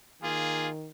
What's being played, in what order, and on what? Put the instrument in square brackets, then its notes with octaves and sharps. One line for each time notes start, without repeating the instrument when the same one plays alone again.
[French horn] D#3 [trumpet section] A#3 F4 G#4